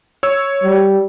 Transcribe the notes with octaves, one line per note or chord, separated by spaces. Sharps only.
C#5 E6
G3